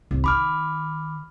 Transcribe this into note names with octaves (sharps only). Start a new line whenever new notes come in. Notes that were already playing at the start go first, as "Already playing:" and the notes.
C2
D#3 B5 D6 F6